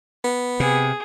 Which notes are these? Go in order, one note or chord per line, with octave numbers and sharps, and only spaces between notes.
B3
C3 G#4